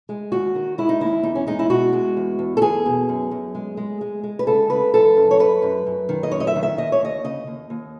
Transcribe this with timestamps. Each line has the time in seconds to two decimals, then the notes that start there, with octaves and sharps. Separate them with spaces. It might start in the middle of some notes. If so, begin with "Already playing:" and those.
0.09 G#3
0.32 D#2 F#4
0.55 D#3
0.78 G#3 E4
0.89 D#4
1.00 D#2 E4
1.23 E2 D#4
1.35 C#4
1.47 G#3 D#4
1.59 E4
1.70 B2 F#4
1.93 G#3
2.17 E2
2.39 E2
2.57 A4
2.62 E2 G#4
2.86 B2
3.09 F#2
3.31 F#2
3.55 G#3
3.77 G#3
4.01 G#3
4.23 G#3
4.39 B4
4.47 C#3 A4
4.70 C#3 B4
4.94 F#2 A4
5.17 F#2
5.31 C#5
5.39 F#2 B4
5.62 F#2
5.86 F#2
6.09 D#3
6.23 D#5
6.31 F#2 C#5
6.40 D#5
6.47 E5
6.56 D#3
6.63 E5
6.78 D#2 D#5
6.92 C#5
7.02 D#2 D#5
7.24 C#3 D#5
7.47 D#2
7.70 D#2